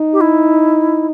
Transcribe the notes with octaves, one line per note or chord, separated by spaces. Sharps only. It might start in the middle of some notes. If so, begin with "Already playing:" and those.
Already playing: D#4
G4
E4